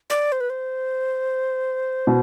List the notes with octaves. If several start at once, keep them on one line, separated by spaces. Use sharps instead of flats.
D5
C5
B4
C5
B2